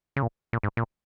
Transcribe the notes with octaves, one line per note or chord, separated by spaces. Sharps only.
C#3
A#2
A#2
G#2
A#2